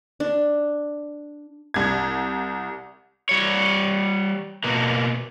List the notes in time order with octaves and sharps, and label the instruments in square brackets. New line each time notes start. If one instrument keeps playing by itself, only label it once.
[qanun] D4
[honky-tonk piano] C2 G#6
[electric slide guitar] G3 C#5
B2 A#3